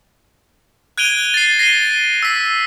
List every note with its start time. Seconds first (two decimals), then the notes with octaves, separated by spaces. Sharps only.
0.98 F#6 G#6 D7 D#7 F7 G7
1.34 A6 C7
1.59 A#6 C7 D#7 G7
2.23 E6 B6